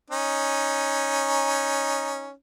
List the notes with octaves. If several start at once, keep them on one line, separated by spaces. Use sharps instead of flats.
C#4 D#4